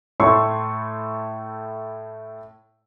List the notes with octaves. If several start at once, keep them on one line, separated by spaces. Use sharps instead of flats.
A2 A3 E4 A4 C6 C#6